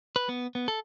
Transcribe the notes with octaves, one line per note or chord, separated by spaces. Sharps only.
B4
B3
B3
A4